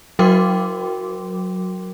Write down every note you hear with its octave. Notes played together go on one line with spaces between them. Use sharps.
F#3 F#4 A#4 G5 C6 D6